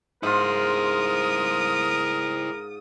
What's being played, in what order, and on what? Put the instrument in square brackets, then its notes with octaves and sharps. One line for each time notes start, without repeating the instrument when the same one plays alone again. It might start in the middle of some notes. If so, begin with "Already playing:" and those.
[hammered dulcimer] G#2 F4 [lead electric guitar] E4 C5 [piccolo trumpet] A#4 [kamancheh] D#6